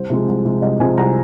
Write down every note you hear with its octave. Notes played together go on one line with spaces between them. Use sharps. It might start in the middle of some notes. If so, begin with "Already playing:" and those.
Already playing: C2 C5
C3 F3 G#3
C2
C3 F3 G#3
C2 D#5
C3 F3 G#3 G#5
C2 A#5